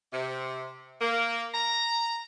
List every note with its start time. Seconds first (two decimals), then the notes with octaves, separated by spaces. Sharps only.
0.12 C3
1.01 A#3
1.54 A#5